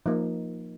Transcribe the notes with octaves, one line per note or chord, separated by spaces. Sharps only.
F3 A#3 D#4